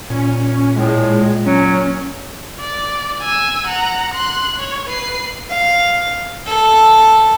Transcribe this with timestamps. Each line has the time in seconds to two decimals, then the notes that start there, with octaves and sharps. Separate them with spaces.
0.10 A#2 C#4
0.76 A2 G#3
1.46 F#3 C#4
2.60 D5
3.22 G#5 E6
3.67 F#5 A#5
4.14 C6 F#6
4.59 C#5
4.90 B4 C7
5.50 F5
6.46 A4